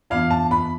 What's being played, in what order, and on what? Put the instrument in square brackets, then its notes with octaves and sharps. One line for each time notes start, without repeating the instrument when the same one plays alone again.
[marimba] F2 E3 B3 D4 [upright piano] F5
[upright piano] A5
B5